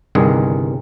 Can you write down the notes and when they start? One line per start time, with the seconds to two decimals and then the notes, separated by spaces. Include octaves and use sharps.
0.15 G1 C2 G2 D#3 G#3 G#4